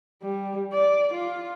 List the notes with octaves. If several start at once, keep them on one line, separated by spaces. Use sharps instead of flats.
G3
D5
F4